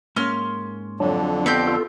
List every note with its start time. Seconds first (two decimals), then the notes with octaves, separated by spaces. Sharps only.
0.16 G#2 A#3 C#4 C6 F6
1.00 F2 D3 F#3 D4
1.46 B3 C4 G4 G6
1.67 F4 A4